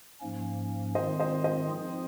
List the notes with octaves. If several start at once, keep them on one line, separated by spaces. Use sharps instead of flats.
G#2 F3 A#3 C#4
D#3 G#3 C4 F4 C5 D#5
C5 D#5
C5 D#5
F3 C4 F4 G#4